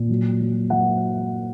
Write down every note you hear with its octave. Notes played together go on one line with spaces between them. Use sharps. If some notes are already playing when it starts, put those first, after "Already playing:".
Already playing: A#2
F#3
F#3
F#3 F#5